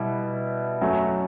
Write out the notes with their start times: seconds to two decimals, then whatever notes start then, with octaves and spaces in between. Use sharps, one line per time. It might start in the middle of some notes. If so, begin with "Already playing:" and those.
Already playing: B2 G3 B3 E4
0.81 F#2 F#3 A3